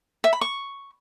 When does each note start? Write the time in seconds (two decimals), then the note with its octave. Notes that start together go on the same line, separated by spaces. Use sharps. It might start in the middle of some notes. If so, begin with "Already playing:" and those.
0.24 E5
0.33 B5
0.41 C#6